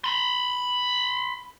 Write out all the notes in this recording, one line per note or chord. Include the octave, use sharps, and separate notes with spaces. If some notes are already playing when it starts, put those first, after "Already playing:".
B5 C6